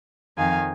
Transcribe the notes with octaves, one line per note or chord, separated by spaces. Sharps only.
F2 D#3 F5 G#5